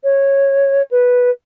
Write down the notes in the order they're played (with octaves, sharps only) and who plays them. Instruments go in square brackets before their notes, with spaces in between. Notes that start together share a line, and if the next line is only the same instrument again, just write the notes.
[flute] C#5
B4